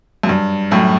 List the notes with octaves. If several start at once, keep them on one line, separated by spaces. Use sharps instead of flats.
F#2
G2
F#2 A2